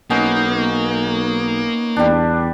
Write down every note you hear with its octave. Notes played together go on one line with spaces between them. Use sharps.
B1 A#3 B3 C#4 D#4
E2 G3 D4